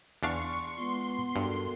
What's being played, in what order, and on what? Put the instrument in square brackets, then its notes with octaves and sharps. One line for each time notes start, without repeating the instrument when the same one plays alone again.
[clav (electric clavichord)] E2 D4 F5 [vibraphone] D5 C6 [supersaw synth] C#6
[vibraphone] G#3 F4 [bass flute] B3 [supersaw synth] C6
[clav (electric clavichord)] G2 [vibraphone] F#4 A4 A#4